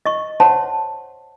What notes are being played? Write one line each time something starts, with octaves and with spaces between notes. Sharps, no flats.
D#5 C#6
C5 C#5 F#5 A5 C6